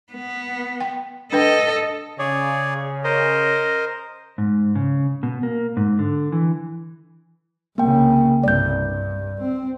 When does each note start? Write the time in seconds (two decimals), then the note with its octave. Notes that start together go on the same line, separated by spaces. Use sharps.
0.13 B3
0.80 G5
1.33 D4 A4 B4 D#5 G5
2.19 C#3 G#4 C#5 D5
3.04 A#4 C5 D#5
4.38 G#2
4.75 C#3
5.23 B2
5.43 A#3
5.77 G#2
5.99 D3
6.32 E3
7.78 C2 C#3 A#3 G5
8.44 C2 G2 D5 G6
8.85 G2
9.41 C4